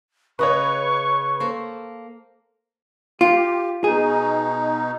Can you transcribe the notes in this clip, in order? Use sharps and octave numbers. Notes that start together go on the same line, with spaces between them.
C#3 B4 C#5 D#5 C#6
A#3 A4 C5
F4 G4
B2 D#4 G#4